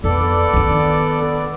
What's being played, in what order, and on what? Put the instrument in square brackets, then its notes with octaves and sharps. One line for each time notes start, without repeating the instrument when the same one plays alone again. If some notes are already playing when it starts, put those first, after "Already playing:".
[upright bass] F2 [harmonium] B3 D5 [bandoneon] A4
[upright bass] D#3 D4